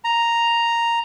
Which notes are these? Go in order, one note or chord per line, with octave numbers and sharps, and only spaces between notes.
A#5